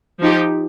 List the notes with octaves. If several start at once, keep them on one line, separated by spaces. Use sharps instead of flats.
F3 D#4 G4